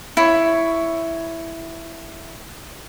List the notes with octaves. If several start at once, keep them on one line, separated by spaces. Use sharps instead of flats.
E4 C#5